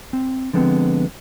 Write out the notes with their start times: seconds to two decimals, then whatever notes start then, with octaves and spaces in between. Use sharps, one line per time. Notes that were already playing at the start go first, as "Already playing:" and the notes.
0.13 C4
0.53 D3 F3 G#3 B3 C4